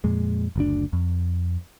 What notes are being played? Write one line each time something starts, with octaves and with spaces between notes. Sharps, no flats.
F2 A#2 G#3
F#1 D2 D4
F2